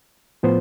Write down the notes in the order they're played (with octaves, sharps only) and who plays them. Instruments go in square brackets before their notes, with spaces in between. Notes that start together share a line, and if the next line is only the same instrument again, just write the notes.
[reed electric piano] A2 F3 B3 F4 C5